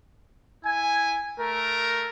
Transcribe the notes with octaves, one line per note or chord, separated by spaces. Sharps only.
E4 G#5
A3 A#4